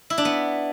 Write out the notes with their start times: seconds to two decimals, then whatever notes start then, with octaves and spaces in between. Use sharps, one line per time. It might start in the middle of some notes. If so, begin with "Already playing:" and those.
0.10 E4
0.18 D4
0.25 B3